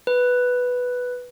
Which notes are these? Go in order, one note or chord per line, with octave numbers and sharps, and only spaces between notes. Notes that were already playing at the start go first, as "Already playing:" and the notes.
B4